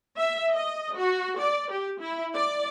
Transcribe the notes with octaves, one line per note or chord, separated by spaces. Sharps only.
E5
D#5
F#4
D5
G4
E4
D5